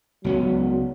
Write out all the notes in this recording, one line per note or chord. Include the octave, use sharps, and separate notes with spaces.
C#2 F#3 B3 C#4